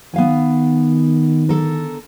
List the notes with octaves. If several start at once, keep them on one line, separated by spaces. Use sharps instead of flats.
D#3 B3 F5 G#5
D3 A4 A#4